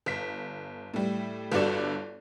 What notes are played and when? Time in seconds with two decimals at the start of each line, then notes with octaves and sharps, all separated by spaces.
0.06 G1 B6
0.94 A2 G3
1.52 G1 G2 F#4 A4 D5 E7